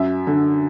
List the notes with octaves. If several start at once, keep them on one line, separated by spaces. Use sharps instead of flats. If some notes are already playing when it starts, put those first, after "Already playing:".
Already playing: F#2 E5
D3